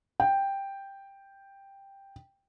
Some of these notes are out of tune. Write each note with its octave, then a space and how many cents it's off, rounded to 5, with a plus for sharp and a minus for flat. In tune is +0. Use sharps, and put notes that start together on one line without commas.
G5 +5